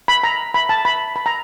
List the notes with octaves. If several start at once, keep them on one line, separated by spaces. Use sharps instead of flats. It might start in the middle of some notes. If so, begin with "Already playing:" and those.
B5
A#5
B5
A5
B5
B5
A#5